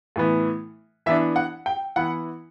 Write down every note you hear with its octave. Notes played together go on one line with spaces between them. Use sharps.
A2 E3 B3
E3 B3 D4 E5
F#5
G5
E3 B3 E4 F#5